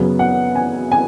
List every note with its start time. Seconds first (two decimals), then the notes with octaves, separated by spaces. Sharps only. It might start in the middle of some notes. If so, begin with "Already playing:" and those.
Already playing: F#2 C#3 F#3 B3
0.19 F#5
0.55 G#5
0.92 G#5